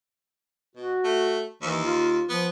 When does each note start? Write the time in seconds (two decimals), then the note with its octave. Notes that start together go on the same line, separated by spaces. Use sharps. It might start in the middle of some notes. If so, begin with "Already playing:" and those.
0.76 B2 F#4
1.04 A3
1.62 D#2 E3
1.84 F4
2.29 F3 B3